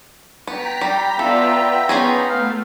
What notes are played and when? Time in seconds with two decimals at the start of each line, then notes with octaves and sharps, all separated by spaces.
0.47 B3 G5 A#5 B6
0.81 G3
1.19 B3 F4 A4 D5 E5
1.89 B3 C#4 D#4 F4 G#4
2.30 A3 F5